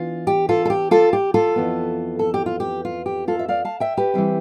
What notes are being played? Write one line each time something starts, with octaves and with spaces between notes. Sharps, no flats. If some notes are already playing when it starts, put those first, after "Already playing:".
Already playing: E3 B3 D4 F4
G4
F4 A4
A4
G4
F4 A4
G4
F4 A4
F2 E3 B3
A4
G4
F4
G4
F4
G4
F4 A4
E5
D5 F5
F5 A5
E5 G5
G4 B4
E3 G3 C4 E4